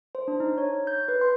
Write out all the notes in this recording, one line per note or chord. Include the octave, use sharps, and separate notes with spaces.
C5
D4
D#4
C#5
G6
B4
C6